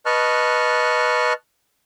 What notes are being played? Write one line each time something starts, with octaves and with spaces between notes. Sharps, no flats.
B4 D#5 A5 C#6 F6 F#6